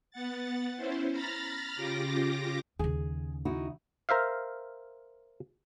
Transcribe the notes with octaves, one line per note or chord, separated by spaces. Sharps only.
B3 F#5 A6
C#4 E4 C5
A#5 B5 F6 A6 A#6
C#3 F4 G4 D6 A#6
D#2 C#3 G#4
D#4 E4 F#4
A#4 C5 E5 F5